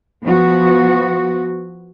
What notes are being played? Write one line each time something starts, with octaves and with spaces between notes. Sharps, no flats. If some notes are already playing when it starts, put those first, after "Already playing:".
F3 B3 F#4